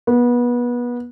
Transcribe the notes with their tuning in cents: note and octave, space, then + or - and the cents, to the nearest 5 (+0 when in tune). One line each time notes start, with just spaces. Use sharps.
B3 -25